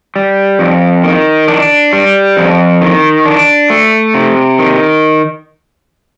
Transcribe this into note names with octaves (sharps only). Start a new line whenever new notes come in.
G3
F2
D#3
D4
G3
F2
D#3
D4
A3
C3
D#3